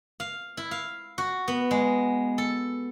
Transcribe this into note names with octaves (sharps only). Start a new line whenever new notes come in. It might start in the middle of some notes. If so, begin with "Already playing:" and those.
F5
E4
F5
F#4
B3
G#3
A4